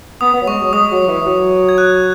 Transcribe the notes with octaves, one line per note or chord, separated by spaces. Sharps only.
B3 D#6
B3
F#3
G#3 C#6
F#3
G#3 D#6
F#3
E3
F#3
G#6
F#6